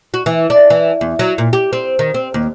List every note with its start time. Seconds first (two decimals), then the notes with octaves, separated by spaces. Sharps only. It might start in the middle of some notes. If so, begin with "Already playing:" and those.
0.14 F#4
0.26 E3
0.50 D4
0.70 E3
1.01 E2
1.19 F#3
1.38 A#2
1.53 G4
1.73 C4
1.99 D#3
2.14 C4
2.34 D#2